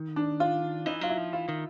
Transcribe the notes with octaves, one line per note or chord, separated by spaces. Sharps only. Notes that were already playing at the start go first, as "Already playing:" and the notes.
Already playing: D#3
D4
F4
E3 D#4
F#3 F4
E4
F3
E3 F4
D#3